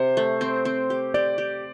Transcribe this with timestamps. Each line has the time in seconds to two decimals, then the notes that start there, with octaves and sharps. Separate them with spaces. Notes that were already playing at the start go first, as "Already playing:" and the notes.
Already playing: C3 C5
0.17 A3
0.41 C4
0.65 C4
0.90 G4
1.14 G4 D5
1.38 G4